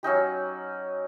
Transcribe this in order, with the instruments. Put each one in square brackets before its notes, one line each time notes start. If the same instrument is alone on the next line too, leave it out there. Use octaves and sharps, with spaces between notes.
[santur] F#3 C#4 D#4 G4